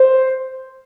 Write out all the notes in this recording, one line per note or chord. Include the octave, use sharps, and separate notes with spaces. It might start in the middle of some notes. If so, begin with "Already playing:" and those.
Already playing: C5